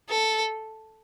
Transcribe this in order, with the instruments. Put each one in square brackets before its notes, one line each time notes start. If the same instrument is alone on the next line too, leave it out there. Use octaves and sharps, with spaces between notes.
[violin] A4